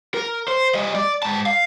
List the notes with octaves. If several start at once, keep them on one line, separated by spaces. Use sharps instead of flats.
A#4
C5
G3 D#5
D5
G#2 A5
F5